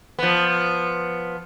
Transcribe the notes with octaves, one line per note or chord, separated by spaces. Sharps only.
F3 B3